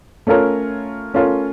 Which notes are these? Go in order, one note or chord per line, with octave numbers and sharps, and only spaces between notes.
A3 C#4 F4 A#4 C#5
A3 C#4 F4 A#4 C#5